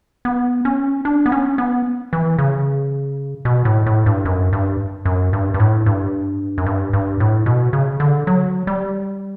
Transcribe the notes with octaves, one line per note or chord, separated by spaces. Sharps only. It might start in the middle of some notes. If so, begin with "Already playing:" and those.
B3
C#4
D4
B3
C#4
B3
E3
C#3
B2
A2
A2
G2
F#2
G2
F#2
G2
G2
A2
G2
F#2
G2
G2
A2
B2
C#3
D3
F#3
G3